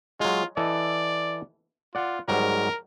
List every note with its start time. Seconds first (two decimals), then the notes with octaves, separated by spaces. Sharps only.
0.20 F#3 G#3 F4
0.57 E3 A4 D5 D#5
1.95 F4 D5 F#5
2.28 G#2 F#3 G3 A#4